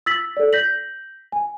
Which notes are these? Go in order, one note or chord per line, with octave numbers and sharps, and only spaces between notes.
E6 A6 B6 F#7
A4 D5
G6 A#6 B6 F#7
G#5